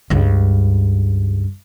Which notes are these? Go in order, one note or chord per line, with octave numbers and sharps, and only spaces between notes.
C#2 G2